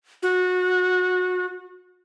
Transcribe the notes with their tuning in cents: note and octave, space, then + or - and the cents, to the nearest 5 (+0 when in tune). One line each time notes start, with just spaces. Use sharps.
F#4 -25